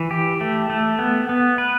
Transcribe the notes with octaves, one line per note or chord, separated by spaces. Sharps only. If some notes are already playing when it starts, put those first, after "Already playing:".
Already playing: E3
G4
A3
A3
B3
B3
B4